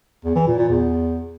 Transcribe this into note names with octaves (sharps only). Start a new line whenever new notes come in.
E2
E3
A#2
A#2
E2